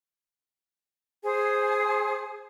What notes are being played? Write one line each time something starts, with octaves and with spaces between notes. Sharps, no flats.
G#4 C5 G#5 D#6